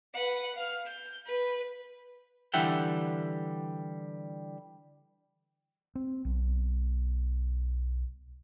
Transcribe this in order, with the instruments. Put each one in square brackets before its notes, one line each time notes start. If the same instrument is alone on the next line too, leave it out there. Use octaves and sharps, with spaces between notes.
[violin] B4 F#5
F5 F6
G6
B4
[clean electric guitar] D3 E3 G3 E5 F#5 G5
[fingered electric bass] C4
B1